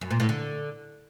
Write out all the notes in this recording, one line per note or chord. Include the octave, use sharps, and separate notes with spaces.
F#2
A#2
A2
D3